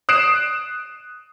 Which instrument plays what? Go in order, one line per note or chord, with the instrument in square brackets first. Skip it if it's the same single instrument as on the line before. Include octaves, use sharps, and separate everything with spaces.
[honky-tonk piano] D#6 F#6 C7 D7 E7